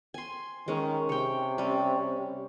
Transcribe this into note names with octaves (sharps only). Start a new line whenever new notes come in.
G#5 C6
D#3 G#3 C#4
C3 C#5 G5
G3 C#4